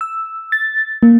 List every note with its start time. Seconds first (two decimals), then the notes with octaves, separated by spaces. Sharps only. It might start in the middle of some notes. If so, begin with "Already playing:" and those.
0.01 E6
0.52 A6
1.03 A#3